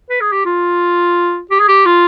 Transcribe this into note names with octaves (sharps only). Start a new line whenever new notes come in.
B4
G#4
G4
F4
G4
G#4
G4
F4